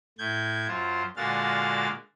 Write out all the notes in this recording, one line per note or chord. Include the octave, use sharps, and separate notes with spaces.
A2 G6 G#6
F#2 F4 C5
A#2 D3 G#3 F#4 F5 A6